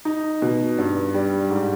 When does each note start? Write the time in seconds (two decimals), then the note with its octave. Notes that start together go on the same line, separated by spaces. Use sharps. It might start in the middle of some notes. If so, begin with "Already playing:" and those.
0.05 D#4
0.42 B2
0.78 G2
1.14 G3
1.50 G#2